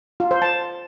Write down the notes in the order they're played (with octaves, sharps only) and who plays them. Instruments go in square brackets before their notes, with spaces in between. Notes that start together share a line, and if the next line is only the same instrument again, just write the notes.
[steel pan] F4
C5
A5